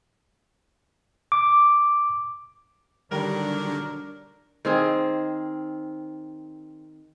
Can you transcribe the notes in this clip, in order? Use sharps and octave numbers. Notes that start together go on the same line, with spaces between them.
D6
D3 D#3 F#3 G3 D4 A#4
D#3 C4 G#4